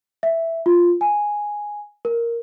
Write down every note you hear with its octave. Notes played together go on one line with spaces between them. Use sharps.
E5
F4
G#5
A#4